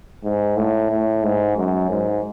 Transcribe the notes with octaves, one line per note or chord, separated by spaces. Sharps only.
G#2
A2
A2
G#2
F#2
G#2